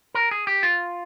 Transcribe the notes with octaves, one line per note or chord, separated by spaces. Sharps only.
A#4
G#4
G4
F4